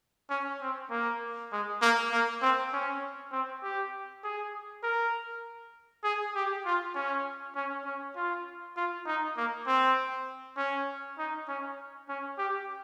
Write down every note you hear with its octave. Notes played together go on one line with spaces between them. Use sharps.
C#4
C4
A#3
G#3
A#3
A#3
C4
C#4
C4
G4
G#4
A#4
G#4
G4
F4
C#4
C#4
C#4
F4
F4
D#4
A#3
C4
C#4
D#4
C#4
C#4
G4